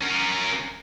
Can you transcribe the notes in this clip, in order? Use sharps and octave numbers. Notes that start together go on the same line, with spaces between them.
C#4 A#4